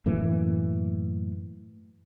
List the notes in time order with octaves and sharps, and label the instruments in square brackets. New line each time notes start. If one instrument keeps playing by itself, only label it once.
[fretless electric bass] F#2 A2 E3 A#3